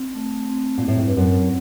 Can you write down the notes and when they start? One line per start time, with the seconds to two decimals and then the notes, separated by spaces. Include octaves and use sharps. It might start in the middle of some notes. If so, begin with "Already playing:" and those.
Already playing: C4
0.15 A3
0.49 C4
0.78 A#2 E4
0.88 A2
0.97 G#2
1.07 G2
1.17 F#2 C4